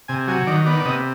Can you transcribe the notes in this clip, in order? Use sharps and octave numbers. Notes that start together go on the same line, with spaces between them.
C3 G#5
F#3 G#5
D#3 D5
B3 D5
D5
C3 D#5